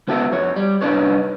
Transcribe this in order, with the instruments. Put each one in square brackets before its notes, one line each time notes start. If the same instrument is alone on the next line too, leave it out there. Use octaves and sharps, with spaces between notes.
[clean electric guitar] C#2 B3 F#4 A4 E5
F2 C#5
G3
C2 D4 D#4 B4 C#5